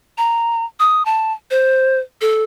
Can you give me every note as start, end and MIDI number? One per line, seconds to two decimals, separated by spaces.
0.18 0.65 82
0.80 1.05 87
1.05 1.33 81
1.51 1.99 72
2.21 2.43 69